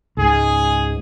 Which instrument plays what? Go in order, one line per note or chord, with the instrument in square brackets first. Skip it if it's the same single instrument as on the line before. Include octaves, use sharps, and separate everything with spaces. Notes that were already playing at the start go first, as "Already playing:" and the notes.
[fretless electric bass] C#2 G#2 [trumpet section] G#4